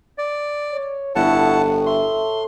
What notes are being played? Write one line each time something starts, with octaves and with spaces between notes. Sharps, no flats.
D5
C#5
G1 A2 E4 F#5 A5
E5 C6